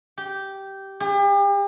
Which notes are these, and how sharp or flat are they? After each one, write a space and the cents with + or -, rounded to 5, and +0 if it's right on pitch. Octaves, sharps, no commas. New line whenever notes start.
G4 -10
G4 +40